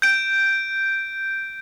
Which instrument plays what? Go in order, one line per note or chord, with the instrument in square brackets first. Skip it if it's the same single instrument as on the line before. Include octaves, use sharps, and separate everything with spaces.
[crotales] G6 D7